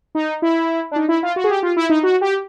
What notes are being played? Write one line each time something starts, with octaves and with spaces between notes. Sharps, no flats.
D#4
E4
D4
D#4
E4
F4
F#4
G#4
G4
F4
E4
D#4
F#4
G4